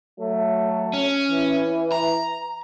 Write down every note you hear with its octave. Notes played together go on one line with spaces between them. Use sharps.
F#3 A3
C#4
E3
A#5